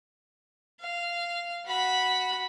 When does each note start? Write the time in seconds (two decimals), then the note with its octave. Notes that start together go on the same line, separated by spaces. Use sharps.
0.81 F5
1.67 F#4 B5